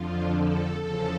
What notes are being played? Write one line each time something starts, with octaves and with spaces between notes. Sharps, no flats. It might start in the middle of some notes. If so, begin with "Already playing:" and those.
Already playing: F2 D3 F3 F4
A4
E2 C#3 F3 A4